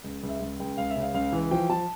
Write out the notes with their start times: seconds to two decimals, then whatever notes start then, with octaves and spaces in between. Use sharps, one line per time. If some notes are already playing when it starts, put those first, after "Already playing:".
0.04 C#2
0.23 C#2
0.29 E5
0.40 C#2
0.60 C#2 G5
0.77 C#2 F5
0.90 E5
0.96 C#3
1.02 F5
1.14 C#2 F5
1.32 E3
1.51 F3 G5
1.69 F3 A5